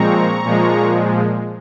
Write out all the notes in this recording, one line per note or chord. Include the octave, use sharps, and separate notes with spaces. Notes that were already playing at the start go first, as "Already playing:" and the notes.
Already playing: A#2 F3 G#3 C4 A#5 C#6
A#2 F3 G#3